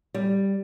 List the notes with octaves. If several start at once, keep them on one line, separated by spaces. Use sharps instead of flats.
G3